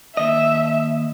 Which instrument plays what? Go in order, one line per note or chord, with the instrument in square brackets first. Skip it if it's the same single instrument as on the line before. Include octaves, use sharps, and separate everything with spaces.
[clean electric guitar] D#2 D#5 [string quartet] E5